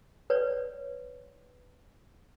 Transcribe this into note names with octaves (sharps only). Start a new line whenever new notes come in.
B4 C#5 D5